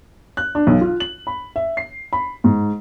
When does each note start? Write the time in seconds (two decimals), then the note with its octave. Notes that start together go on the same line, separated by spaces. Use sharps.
0.37 F#6
0.55 D4
0.67 B1
0.81 F4
1.00 F#7
1.27 B5
1.56 E5
1.77 C7
2.13 B5
2.44 G#2